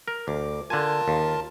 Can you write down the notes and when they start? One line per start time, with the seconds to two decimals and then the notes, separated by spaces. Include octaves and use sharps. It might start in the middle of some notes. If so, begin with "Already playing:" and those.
0.08 A#4
0.28 D2 D6
0.70 D3 F4 A#4 G#5 A5
1.08 D#2